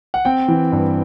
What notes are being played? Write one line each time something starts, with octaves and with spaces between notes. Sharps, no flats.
F#5
C4 G5
E3
G2